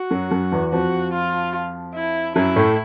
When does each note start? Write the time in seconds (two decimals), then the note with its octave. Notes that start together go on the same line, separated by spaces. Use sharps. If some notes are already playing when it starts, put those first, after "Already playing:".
Already playing: F#4
0.11 F#2 F#3
0.31 F#2 F#3
0.52 E2 E3
0.72 F2 F3 F#4
1.13 F4
1.95 E4
2.36 F#2 F#3 E4
2.56 A2 A3